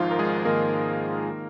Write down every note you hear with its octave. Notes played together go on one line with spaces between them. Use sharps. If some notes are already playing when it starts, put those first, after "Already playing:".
Already playing: G#1 G#2 D#3 F3 D#4 F4
A#4
G#3 G#4
G#1 G#2 D#3 A#3 A#4
D#3